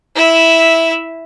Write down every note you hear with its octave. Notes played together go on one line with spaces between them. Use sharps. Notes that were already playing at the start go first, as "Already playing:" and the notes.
E4 E5